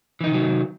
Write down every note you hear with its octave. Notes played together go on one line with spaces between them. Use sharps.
C3 D#3 E3 F#3 D#4